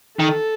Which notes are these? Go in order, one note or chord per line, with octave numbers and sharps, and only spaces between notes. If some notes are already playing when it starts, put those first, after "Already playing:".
D#3 A4